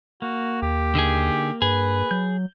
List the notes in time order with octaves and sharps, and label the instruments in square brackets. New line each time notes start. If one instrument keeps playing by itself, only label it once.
[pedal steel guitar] A#3 [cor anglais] F#4
[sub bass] D#2 [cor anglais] G4
[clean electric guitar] D3 D#4 G#4
[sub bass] G2 [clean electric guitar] G#4 [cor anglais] B4
[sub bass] F#3 [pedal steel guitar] G6